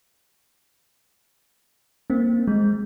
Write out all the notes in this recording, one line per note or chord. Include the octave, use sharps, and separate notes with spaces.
A#3 C4
G#3